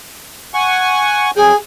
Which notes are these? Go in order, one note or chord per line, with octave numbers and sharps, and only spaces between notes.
F#5 G#5 C#6
F2 F#3 G#4 G5